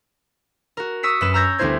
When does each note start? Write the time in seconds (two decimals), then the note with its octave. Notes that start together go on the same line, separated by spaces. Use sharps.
0.77 F#4 A#4
1.03 C#6 D#6 E6 B6 C#7
1.21 F#2 F#3 C#4 B4 E7
1.34 A#5 E6 F6 G6 G#6 A#6
1.58 D2 G3 B3 E4 C5 G#6